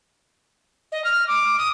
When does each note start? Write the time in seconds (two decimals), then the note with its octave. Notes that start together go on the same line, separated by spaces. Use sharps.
0.92 D#5
1.04 F6
1.28 D6
1.58 D#6